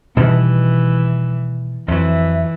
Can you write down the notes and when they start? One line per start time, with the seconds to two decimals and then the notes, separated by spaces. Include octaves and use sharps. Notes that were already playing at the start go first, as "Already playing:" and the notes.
0.17 B2 D#3 E3 G3
1.88 F2 E3 F#3 E5